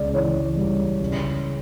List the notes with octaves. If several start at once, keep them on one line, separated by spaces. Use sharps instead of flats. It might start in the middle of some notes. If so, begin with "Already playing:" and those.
Already playing: C#2 C#3 D5
E3 C#5
G3
C#3